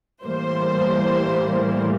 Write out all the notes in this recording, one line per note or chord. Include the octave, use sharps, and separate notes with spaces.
A2 E3 G3 A#3 C5